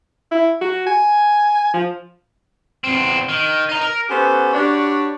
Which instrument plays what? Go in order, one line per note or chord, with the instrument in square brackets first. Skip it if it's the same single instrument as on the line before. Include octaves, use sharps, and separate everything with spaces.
[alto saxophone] E4
F#4
G#5
F3
[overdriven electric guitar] E2 C4
D#3
D#5 A#5
A#4
[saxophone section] B3 C#4 F#4 G4 A4 C5
G3 D4 F#4 C#5 D5